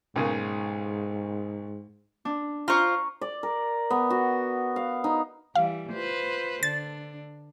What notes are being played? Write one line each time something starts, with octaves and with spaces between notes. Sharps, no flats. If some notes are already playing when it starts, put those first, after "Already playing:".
B1 G#2 C#3 A#3
D4
F4 C5 A#5 C#6
D5
A#4
B3
F#4
F5
D#4
E3 G3 F5
F4 B4 C5
D3 D4 A6